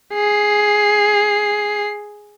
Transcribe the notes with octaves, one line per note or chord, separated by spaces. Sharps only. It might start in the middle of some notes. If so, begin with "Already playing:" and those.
G#4 C7